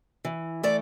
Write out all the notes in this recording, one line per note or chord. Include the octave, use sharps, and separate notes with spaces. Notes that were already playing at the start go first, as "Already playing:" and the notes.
E3
A3 D5